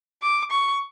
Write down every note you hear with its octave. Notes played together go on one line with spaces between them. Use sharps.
D6
C#6